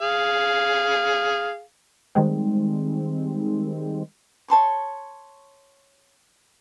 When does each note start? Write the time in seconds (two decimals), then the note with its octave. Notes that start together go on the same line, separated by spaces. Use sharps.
0.01 G#4 F5
2.15 D#3 G3 G#3 C4
4.48 C#5 A5 C6 C#6